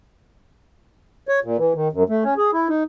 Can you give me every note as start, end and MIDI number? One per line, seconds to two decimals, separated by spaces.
1.28 1.40 73
1.44 1.57 46
1.58 1.73 52
1.75 1.88 51
1.93 2.03 42
2.09 2.24 57
2.24 2.34 61
2.37 2.51 68
2.53 2.68 64
2.69 2.83 63